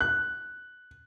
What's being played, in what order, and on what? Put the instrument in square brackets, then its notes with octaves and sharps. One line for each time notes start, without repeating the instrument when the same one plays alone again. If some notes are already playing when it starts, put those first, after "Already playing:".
[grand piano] F#6